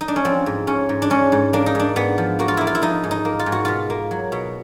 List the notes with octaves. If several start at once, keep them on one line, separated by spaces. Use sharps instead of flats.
D#4
D4
C#4
F3 C4
G#2
G#2 C#4
G#2
D4
G#2 C#4
G#2
A#3 D4
D#4
G#2 D4
G#2 B3
F3
A#3 F#4
F4
A#3 E4
F4
E4
F3 D#4
G#2
D#4
A#3
F4
G#2
F#4
B2 F4
A#3
F#3
B2